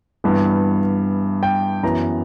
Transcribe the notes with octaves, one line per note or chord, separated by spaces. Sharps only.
G2 E3 B3
G5
F#2 E3 B3 A#5